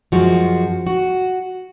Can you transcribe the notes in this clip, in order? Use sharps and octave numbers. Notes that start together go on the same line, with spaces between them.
F#2 F3 G#3 F#4
F#4